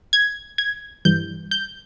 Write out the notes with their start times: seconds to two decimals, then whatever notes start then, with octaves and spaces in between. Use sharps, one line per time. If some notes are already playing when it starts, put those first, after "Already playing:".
0.13 G#6
0.58 G#6
1.05 G2 E3 G3 G6
1.51 G6